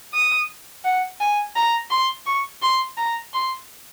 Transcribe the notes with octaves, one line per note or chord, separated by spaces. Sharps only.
D#6
F#5
G#5
A#5
C6
C#6
C6
A#5
C6